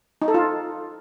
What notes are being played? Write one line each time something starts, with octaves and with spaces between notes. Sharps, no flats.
D#4
A4
F4